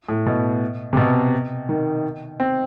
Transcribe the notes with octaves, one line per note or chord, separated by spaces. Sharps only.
A2
B2
C3
B2
D#3
C4